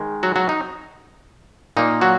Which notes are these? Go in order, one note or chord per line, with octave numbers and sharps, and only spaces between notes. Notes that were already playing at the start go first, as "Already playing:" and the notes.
Already playing: D#3 G#3
F#3 F#4
F#3 F#4
D#4
A#2 A#3 D#4
F#3 F#4